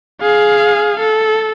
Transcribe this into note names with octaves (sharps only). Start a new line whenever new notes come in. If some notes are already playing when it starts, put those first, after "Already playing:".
G#4 F5
A4